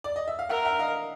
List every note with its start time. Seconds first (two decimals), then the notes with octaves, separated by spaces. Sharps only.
0.04 D5
0.16 D#5
0.28 E5
0.39 F5
0.49 A#4 E5 F#5
0.65 E5 F#5
0.79 D#5 F5